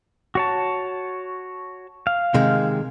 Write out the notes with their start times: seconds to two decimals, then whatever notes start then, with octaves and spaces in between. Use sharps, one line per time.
0.35 F#4 C#5 A5
2.07 F5
2.34 C3 D#3 G#3